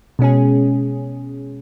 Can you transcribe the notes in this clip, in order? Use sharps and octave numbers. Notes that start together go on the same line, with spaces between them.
B2 G#3 C#4 G#4